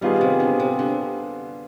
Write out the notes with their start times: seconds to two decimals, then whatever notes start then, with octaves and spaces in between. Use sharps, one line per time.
0.01 D#3 G3 B3 F4 G#4
0.21 C3
0.40 D3
0.60 C3
0.79 D3